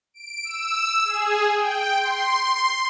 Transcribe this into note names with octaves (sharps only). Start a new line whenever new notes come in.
D7
E6
G#4
G5
C6